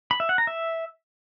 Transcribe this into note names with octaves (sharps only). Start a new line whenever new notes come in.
B5
E5
F#5
A#5
E5